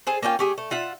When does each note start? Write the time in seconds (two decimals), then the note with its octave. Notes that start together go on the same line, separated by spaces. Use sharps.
0.07 G#4 A4 C5
0.23 A#3 C#4 F4 G5
0.39 A3 G4 G#4
0.58 A3
0.71 F4 E5 F#5